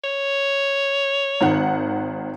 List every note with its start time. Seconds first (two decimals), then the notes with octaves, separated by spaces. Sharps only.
0.04 C#5
1.41 G#1 D#3 F#5